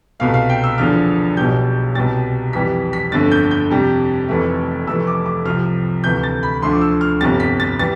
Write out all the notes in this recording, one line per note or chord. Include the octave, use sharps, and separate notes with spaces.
C2 B2 A3 F5
F5
G5
E6
E2 D3 F3 F6
B1 B2 G3 G6
C2 B2 G3 A6
F2 E3 G3 B6
B6
G1 F2 D3 A3 A6
G6
G6
F2 C3 G3
F1 F2 E3 A3
F1 F2 E3 A3 E6
D6
D6
C2 C3 F3 F6
D2 C3 E3 A3 G6
A6
B5
D2 D3 F3 A3 C6
D6
E6
F6
G1 F2 C3 G3 A6
B6
A6
E3 G3 A6